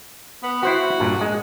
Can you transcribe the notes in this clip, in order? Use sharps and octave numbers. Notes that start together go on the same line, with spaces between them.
B3
E4 F#4 C5 F#5
G2 A#2
G#3